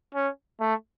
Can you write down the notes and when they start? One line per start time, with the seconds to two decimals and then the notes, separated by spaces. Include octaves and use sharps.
0.15 C#4
0.60 A3